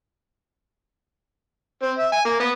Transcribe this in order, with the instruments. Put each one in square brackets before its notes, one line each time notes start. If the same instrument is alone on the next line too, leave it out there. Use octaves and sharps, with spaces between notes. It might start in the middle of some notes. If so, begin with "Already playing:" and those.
[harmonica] C4
E5
G#5
A#3
B3